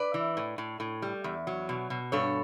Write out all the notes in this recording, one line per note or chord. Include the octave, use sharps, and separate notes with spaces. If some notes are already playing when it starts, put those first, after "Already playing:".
Already playing: B4 D5
E3
A2
A2
A2
G3
E2
F#3
B2
B2
G2 A4 C#5